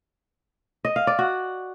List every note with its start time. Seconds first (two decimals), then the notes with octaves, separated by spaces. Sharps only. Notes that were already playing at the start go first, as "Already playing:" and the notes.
0.85 D#5
0.96 F5
1.07 D5
1.19 F#4